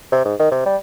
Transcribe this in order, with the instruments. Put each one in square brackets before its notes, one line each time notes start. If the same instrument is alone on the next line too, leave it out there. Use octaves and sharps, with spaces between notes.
[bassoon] C3
G#2
D#3
C3
G3